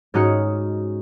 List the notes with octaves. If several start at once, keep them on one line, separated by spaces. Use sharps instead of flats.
G#2 C#4 D#4 F#4 F6 C#7